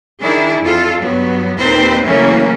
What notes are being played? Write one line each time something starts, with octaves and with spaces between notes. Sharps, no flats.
D#3 D4 E4 G#4
F2 F4 A4
G2 F#3 B3
D#2 A#2 C4 D#4 B4 C5
C#3 E3 F#3 A3 A#3 C#4